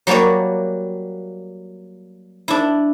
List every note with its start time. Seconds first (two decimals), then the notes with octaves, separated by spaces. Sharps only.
0.07 F#3 G3 A#3 C#5 D5
2.48 D4 E4